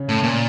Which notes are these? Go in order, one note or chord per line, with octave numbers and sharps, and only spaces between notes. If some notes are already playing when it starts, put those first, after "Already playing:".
Already playing: C#3 C#4
A2
A#2